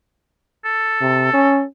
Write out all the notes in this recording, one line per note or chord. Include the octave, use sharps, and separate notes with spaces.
A4
C3
C#4